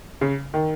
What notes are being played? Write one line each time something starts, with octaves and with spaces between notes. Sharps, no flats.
C#3
D#3